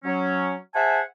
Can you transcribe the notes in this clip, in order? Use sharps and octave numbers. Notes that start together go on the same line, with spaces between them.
F#3 C#4
G#4 C5 E5 F#5 G#5 A5